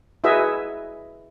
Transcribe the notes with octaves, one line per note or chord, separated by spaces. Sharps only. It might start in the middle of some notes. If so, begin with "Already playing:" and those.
E4 F#4 G#4 B4 D#5 E5